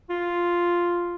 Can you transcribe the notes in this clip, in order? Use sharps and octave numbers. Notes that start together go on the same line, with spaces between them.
F4